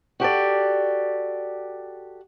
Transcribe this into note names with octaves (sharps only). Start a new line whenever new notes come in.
F#4 G4 A4 D5